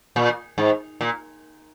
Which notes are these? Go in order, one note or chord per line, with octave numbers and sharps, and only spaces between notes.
A#2
G#2
A#2